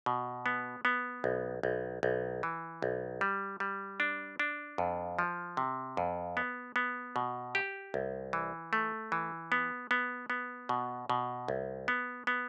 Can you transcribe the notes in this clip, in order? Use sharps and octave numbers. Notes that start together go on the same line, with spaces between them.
B2
B3
B3
B1
B1
B1
E3
B1
G3
G3
D4
D4
F2
F3
C3
F2
B3
B3
B2
G4
C2
E3
A3
E3
B3
B3
B3
B2
B2
C2
B3
B3